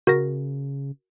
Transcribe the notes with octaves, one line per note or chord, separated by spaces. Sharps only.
C#3 F#4 A#4 A#6